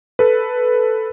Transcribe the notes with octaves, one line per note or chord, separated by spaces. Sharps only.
A4 B4